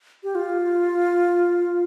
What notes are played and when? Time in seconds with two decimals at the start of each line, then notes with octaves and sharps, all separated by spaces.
0.24 G4
0.35 F4